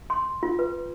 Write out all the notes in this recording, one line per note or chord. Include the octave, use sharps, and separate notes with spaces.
C6
F4
B4